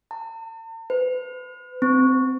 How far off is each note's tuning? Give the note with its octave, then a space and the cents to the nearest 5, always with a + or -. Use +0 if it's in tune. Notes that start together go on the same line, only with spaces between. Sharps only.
A5 +45
B4 +40
C4 -10